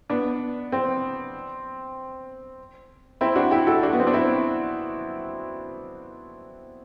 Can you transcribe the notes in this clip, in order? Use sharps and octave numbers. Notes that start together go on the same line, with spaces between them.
B3 D4
C4
C4 E4
D4 F#4
E4 G4
F#4 A4
D4 F#4
B3
C4
D4
C4 E4